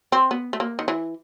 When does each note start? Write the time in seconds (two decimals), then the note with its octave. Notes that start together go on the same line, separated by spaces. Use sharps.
0.12 C4
0.31 B3
0.53 A3
0.60 A#3
0.79 D#3
0.88 E3